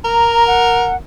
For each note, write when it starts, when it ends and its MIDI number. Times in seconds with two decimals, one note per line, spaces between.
0.04 0.96 70
0.04 0.47 82
0.47 0.96 78